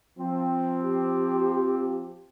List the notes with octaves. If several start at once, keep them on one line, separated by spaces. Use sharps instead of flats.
F3 C4
G4